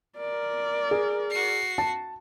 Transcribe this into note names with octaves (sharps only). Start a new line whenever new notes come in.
A#4 D5
G#4
F#4 C7
A5